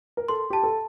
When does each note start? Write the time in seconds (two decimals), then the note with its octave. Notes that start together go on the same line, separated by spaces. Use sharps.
0.17 A#4
0.28 A4 C6
0.50 G4 A5
0.63 A4